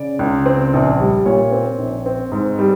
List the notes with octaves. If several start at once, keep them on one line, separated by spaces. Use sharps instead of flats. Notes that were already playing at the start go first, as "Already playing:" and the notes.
Already playing: C#3 D5
C#2
C4
A#1
G3
A#2 C#5
C4
A#1
C4
G#2
G3